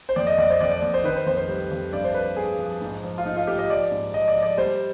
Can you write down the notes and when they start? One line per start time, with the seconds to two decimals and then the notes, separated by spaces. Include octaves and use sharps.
0.09 C5
0.16 F2 D5
0.27 D#5
0.38 F2 D5
0.50 C5
0.60 F2 D5
0.71 D5
0.82 F2
0.94 C5
1.04 D#3 B4
1.16 C5
1.26 F2 C5
1.37 C5
1.48 G3
1.71 F2
1.93 G2 D5
2.04 C5
2.14 F3 B4
2.36 G2 G#4
2.59 F3
2.81 G#2
3.04 F3
3.18 F4
3.25 G#2 D#4
3.37 F4
3.47 G#2 G4
3.59 D#5
3.70 F3 D5
3.91 G#2
4.14 F3 D#5
4.28 D5
4.36 F3
4.43 D5
4.57 G3 C5